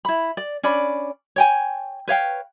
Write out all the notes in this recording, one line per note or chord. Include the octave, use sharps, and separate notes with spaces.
E4 B5
D5
C#4 D4 D5 B5
C#5 G5 G#5
B4 C#5 F5 G5